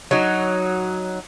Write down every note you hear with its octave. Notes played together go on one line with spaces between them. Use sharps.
F#3 D#4